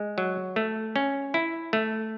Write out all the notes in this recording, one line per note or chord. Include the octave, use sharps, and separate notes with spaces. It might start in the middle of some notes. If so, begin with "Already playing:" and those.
Already playing: G#3
F#3
A3
C#4
E4
A3